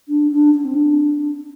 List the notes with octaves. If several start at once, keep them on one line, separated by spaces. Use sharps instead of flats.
D4
D4
D4
C4
D4